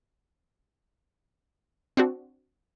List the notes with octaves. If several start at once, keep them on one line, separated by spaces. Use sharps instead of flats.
C4 D4 F#4